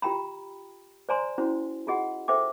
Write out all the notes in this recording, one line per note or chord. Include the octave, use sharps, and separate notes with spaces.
F4 G4 G5 A#5 B5
C5 D5 G#5 A#5 C6
C#4 E4 F#4 C5
F4 F#4 G#4 D#5 F#5
A4 C5 E5 G5 D6